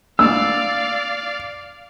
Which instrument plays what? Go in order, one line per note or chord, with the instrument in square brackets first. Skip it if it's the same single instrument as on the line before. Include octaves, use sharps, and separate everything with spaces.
[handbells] A3 A#3 D4 [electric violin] D5 F5 [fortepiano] E6